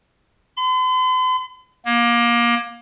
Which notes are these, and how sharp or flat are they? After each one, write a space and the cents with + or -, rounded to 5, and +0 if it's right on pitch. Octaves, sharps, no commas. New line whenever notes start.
C6 -45
A#3 +25